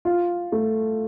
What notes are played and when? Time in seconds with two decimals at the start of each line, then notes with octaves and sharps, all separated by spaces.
0.05 F4
0.52 A3